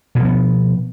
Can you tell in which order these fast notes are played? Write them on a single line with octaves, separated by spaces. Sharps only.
B2 F3 B3